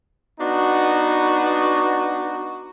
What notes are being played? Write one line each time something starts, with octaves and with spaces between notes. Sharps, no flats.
B3 D4 D#4 F#4